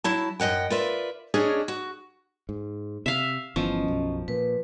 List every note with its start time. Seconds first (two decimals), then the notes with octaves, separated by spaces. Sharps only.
0.04 F#3 E4 A5
0.40 F#2 D#5 F#5 G5
0.70 F4 A#4 B4 D5 E5
1.34 C#4 D4 G#4 C#5 D#5
1.68 F#4
2.49 G#2
3.06 C3 E5 F5
3.56 G1 E3 F3 B3 C#4 D#5
3.88 B1 F#2
4.28 A#2 B4